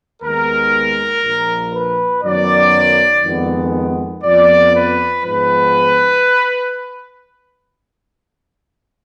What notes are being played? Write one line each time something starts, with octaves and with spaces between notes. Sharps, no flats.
D#2 D#3 G#3 B3 A#4
A#1 A#2 F3
B4
F#2 D#3 F#3 B3 D5
F2 D#3 G#3 B3
F2 F3 B3 D5
B4
G#2 F3 G#3 B3 B4